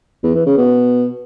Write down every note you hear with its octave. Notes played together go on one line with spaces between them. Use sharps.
E2
E3
C#3
B2